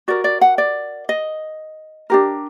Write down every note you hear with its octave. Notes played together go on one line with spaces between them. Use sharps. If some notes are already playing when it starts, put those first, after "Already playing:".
F#4 A#4 D5
D5
F#5
D5
D#5
D4 G4 A#4